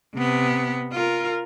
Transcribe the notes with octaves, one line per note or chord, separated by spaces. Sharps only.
C3 B3
F4 A#4